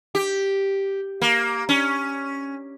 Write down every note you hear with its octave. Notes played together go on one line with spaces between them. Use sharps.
G4
A#3
C#4